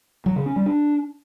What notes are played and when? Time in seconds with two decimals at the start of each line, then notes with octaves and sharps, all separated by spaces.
0.26 F#3
0.36 C#3
0.46 C#4
0.56 G3
0.66 D4